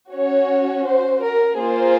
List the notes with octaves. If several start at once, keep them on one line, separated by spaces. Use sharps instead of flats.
C#4 F#4 C#5
C5
A#4
A#3 F4 G#4 C5